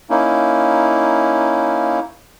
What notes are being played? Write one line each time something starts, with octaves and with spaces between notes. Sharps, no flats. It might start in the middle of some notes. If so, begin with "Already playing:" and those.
A#3 C#4 D#4 E4